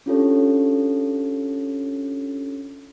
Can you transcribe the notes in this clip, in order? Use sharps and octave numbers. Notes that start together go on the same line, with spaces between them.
C#4 D4 F4 G4 A4 C#5